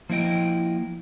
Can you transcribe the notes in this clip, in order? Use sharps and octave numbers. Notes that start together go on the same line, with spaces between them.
F3 A#3 E4 D#5 G5